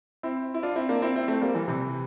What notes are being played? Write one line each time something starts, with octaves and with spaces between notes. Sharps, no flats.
C4 E4
E4
D4 F4
C4 E4
A#3 D4
C4 E4
C4 E4
A3 C4
G3 A#3
E3 G3
C3 E3